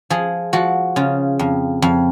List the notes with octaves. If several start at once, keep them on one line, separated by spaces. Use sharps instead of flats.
F3 G#4
F3 F#4
C#3 F4
F2
F2